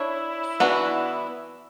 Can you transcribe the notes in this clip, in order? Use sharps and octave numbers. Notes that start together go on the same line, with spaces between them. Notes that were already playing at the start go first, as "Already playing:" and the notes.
Already playing: D4 E4 C#5
E3 B3 D4 F#4